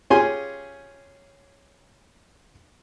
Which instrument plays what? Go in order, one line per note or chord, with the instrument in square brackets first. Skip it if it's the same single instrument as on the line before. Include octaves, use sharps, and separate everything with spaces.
[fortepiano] C#4 F4 G4 G#4 G#5 C6